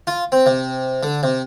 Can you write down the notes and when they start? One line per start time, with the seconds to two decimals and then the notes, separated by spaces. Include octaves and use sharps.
0.07 F4
0.32 C4
0.46 C3
1.03 D3
1.23 C3